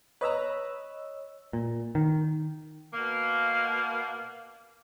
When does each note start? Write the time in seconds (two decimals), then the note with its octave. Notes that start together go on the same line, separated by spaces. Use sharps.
0.21 B4 C#5 D#5 A#5 E6
1.53 A#2
1.95 D#3
2.93 B2 A#3